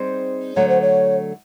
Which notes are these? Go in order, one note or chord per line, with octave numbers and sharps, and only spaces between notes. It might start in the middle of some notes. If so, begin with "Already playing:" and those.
Already playing: G3 C4 D#4 G#4 C5
D3 F#3 A3 C#5
C5
C#5